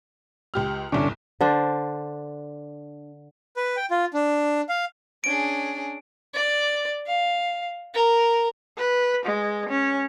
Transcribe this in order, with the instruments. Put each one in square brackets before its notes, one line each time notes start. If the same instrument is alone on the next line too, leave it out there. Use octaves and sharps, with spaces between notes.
[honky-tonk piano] C#2 G4 F6
[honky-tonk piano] G1 C2 [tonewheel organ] D3 C#4 D4
[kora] D3 D4 C5
[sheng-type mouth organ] B4
G5
F4
D4
F5
[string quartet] C#4 D4 G#4 [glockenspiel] D7
[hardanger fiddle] D5
F5
A#4
[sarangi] B4
G#3
C#4